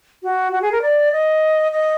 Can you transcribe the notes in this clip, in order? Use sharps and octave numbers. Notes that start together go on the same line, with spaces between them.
F#4
F#4
G#4
A#4
D5
D#5
D#5